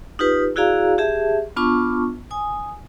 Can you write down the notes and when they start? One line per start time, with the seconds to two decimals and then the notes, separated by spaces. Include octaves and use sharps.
0.19 D#4 F4 G4 B4
0.56 E4 F#4 G#4 D5 F5 A#5
0.98 G4 G#4 E5 A5
1.56 B3 D4 F4 A5 C#6
2.31 G#5 D#6